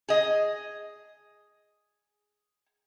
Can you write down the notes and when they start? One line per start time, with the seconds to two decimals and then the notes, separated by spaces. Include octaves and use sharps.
0.09 G#4 D#5